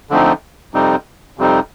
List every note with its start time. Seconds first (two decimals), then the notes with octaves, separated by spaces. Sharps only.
0.10 D3 F3 A3 C4 D#4
0.74 F2 C3 G3 C4 D#4
1.38 F2 C3 G3 C4 D#4